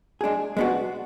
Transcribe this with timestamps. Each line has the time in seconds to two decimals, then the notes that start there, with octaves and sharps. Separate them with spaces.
0.21 G#3 D4 G#4
0.57 G#3 B3 D4 F#4